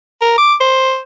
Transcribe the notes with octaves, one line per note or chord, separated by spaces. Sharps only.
A#4
D6
C5